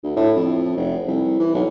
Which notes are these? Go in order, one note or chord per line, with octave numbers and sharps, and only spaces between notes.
D2
A2
F2
F1
C2
E3
B1